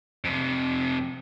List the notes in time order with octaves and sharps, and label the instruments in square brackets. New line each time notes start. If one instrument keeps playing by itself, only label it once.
[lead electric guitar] F2 C3